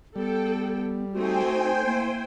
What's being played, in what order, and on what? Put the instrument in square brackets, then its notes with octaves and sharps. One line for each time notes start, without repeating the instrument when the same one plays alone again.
[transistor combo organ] G3 [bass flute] B3 [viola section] A4 G5
[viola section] A3 C4 D#4 [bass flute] F#4 [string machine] C5 G5 G#5
[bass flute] A#3 [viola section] E4